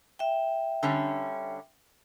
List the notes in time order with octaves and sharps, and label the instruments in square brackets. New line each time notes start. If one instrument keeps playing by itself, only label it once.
[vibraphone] E5 G5
[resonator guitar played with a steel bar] D3 G3 C#4